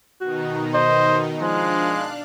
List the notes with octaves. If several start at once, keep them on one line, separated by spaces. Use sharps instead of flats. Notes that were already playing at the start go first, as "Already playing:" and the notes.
B2 D#3 D#4 F#4
C5 D#5
F3 G#3 D4 F5 F#6